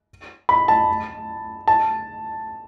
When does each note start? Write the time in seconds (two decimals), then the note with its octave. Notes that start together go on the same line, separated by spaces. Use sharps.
0.49 B5
0.68 A5
1.68 A5